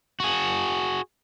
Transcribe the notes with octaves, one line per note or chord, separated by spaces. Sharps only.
F#4 G#4